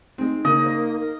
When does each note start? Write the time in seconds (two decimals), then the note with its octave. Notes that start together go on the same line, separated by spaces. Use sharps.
0.18 G#3 C4 D#4
0.45 C#3 A#3 D#5
0.64 A#4 C5
1.00 A#4